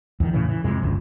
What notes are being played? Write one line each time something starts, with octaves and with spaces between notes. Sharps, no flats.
E2 D#3
A2 C#3 E3
E3
F2 C3 G#3
G1 C#2